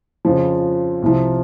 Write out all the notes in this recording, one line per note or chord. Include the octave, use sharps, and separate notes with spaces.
F2 C#3 F3
C2 C3 F3